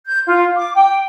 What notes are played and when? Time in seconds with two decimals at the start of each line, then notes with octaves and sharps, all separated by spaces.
0.06 G6
0.27 F4
0.56 D6
0.75 G5